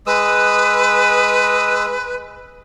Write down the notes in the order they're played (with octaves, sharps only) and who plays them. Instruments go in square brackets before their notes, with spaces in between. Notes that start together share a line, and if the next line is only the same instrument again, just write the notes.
[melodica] G#3 D#6 E6 [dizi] B4